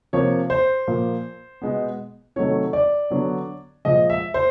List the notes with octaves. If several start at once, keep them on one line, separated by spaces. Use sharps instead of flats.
C3 F3 A#3 C#5
C5
A#2 F3 A#3
B2 G#3 B3
C3 D#3 F#3 A3 C#5
D5
D3 F#3 B3
A#2 F3 G#3 D#5
E5
C5